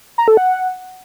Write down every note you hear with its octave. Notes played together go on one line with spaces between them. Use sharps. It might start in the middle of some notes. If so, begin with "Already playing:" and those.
A#5
A4
F#5